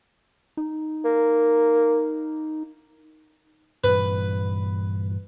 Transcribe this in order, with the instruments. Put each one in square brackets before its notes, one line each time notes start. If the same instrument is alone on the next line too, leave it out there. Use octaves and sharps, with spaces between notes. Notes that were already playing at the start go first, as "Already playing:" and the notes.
[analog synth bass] D#4
[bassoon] A#3
[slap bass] G2 A#2 E3 [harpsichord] B4